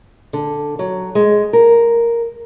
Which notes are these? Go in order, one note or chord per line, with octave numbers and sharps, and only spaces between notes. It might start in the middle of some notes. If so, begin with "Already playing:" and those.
D3
F#3
G#3
A#4